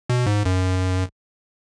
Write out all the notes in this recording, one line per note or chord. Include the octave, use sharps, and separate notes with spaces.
B2
G#2
F#2